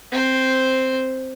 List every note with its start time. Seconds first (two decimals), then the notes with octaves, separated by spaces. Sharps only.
0.12 C4 C5